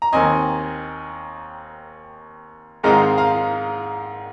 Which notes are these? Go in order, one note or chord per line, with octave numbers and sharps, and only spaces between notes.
A#5
D#2 D#3 C4 D#5 G#5
G#2 D#3 G#3 C4 D#4 F5 A#5
F5 A#5